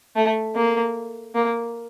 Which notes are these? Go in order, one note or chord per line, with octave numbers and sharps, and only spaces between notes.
A3
A#3
A#3